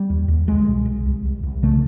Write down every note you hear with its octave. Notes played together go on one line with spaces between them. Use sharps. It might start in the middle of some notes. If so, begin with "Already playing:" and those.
Already playing: G3
D#2
D#2
C2 G#3
B2
C2
C2
C2
C2
C#3 A3